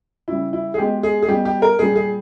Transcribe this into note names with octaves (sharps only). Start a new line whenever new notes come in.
C#3 G3 E4
E4
G#4
B2 G#3 G4
G#4
G#4
B2 G3 G4
G4
A#4
A#2 G3 G#4
G#4